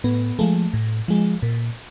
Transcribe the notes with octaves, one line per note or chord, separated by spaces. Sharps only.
A2 B3
F3 G#3 A3
A2
F3 G#3
A#2